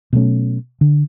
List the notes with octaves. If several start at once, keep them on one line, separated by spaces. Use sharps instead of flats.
B2 F#3 A3 C#4
D3